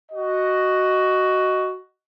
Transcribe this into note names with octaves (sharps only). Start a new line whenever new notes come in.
F#4 D#5